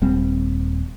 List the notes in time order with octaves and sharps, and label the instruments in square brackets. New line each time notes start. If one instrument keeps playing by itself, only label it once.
[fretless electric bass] D#1 G3 C4